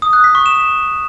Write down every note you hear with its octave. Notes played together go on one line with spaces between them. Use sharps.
D#6
F#6
B6
C#6
E7